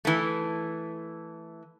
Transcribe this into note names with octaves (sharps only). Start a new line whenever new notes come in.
E3 A3